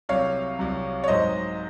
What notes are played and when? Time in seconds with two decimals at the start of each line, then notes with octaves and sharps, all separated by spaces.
0.09 C2 C3 F#3 C#5 F5
0.59 C2 C3 F#3
1.04 C#5
1.08 G#2 F#3 C5 D#5